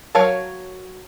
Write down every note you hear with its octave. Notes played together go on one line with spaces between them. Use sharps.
F#3 A#4 C#5 F5 A5